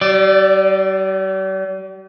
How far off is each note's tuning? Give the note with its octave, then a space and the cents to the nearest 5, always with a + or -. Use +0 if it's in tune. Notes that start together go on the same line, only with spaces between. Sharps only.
G3 -45 D5 +0